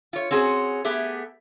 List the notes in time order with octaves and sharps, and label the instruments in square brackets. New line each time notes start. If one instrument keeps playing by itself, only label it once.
[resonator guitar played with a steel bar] F4 C#5
C4 C#4 F#4 G#4
A3 B3 G4 G#4